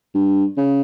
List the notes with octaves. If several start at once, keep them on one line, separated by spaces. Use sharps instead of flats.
G2
C#3